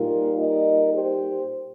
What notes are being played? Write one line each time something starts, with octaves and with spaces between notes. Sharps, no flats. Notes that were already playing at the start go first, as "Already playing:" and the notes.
Already playing: A#2 G3 D#4 F4 A#4
A#4 D#5
G4 C5